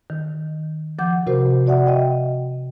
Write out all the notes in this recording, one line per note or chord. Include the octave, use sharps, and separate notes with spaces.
D#3
F3 F#5 D6 G6
C3 F#4 A#4 C5
F#4 D5 E5 F#5
D#5 G5